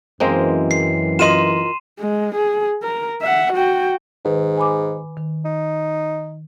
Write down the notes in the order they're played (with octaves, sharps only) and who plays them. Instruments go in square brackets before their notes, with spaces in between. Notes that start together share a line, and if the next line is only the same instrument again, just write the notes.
[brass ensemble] F#2 E3 [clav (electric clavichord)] G#3 A#3 C4 [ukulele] C5 D#5
[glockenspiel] C7
[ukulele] F4 A#4 D#5 [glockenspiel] C6 D#7 E7
[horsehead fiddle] G#3
G#4
A#4
E5 F#5
F#4 G5
[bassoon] G#2 [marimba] D#3 B4
[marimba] G#5 B5 D6
D#3
[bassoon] D#4